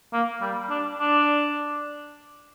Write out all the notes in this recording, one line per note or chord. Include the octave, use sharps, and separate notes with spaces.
A#3
G3
D4
D4